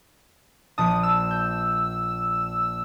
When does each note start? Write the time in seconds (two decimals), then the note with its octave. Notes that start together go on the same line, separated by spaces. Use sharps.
0.78 A#1 A5 D#6
1.03 E6
1.31 G6